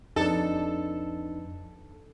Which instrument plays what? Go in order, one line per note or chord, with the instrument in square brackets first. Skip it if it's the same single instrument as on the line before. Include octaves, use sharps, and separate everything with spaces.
[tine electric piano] F2 B4 [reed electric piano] D4 D#4 [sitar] A4